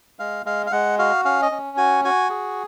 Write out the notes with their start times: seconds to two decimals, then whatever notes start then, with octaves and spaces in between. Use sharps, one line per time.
0.19 G#3 F5
0.45 G#3 F5
0.66 F5
0.72 G#3 F#5
0.99 F#4 F5
1.25 C#4 F5
1.42 D#5
1.51 C#4
1.77 F#4 G#5
2.05 F#4 G#5
2.30 G#4